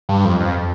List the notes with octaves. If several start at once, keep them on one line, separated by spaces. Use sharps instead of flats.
G2
F2
F2